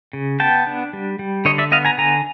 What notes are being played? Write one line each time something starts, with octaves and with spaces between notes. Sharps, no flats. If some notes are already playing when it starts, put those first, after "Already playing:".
C#3
B3 G5 A5
D4
G3
G3
D3 C#5 D#5
D5 E5
B3 D#5 F5
G#5 A#5
D3 G#5 A#5